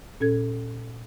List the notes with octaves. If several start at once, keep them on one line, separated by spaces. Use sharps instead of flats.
A#2 C#4 A4 G#6